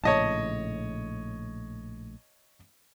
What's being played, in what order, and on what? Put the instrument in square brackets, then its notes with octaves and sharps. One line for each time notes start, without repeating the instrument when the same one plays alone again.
[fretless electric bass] A#1 A2 C#3 [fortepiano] C#5 D#5 A5